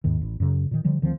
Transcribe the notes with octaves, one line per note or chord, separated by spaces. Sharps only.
D#2 G#2 D#3
A1
F#2 C#3
A#2 D#3
D3 F3 G3
D2 D#3 F3 C4